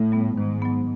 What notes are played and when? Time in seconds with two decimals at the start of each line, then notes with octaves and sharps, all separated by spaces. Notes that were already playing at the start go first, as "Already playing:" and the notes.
Already playing: A2
0.12 G3 B3
0.37 G#2 D#3
0.62 F#3 B3